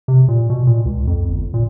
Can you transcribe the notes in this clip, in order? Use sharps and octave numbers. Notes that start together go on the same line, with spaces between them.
C3
A#2
B2
A#2
C#2
F2
G1
A#2